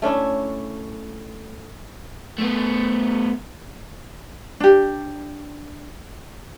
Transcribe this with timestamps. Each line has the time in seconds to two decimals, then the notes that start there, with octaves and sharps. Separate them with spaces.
0.02 A3 C#4 D4 E4
2.38 A3 B3
4.60 D4 G4